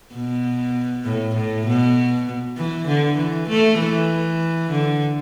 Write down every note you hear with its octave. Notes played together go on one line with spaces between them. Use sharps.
B2
A2
A2
B2
E3
D3
E3
A3
E3
D3